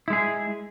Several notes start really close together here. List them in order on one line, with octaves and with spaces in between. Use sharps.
E4 G#3 G#4